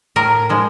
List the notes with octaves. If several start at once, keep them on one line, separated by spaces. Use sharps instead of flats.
A2 A#4
F3 G#3